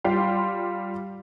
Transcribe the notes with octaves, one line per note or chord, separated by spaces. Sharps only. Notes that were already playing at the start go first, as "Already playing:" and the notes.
G3 F4 F5 G5 C6